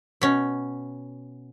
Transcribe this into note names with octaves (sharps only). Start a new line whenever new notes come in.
B2 C#4